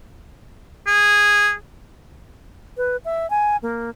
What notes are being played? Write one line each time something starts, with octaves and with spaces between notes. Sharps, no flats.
G#4
B4
E5
G#5
A#3